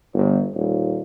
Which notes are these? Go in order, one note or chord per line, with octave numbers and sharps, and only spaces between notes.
G1
D#1